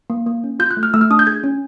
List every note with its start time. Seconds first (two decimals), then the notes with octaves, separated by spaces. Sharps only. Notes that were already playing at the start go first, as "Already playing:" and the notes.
0.10 A#3
0.26 A#3
0.44 C#4
0.60 F4 G6
0.71 F#6
0.77 A3
0.83 F6
0.94 A3 E6
1.01 F6
1.10 D4 D#6
1.19 G6
1.27 G#4 G#6
1.44 C#4